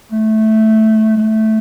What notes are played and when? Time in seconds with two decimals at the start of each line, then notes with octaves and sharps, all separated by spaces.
0.12 A3
1.17 A3